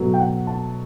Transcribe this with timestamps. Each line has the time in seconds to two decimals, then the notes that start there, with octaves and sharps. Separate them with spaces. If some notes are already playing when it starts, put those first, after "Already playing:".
Already playing: B2 F#3 A3
0.14 G5
0.20 F#5
0.47 A5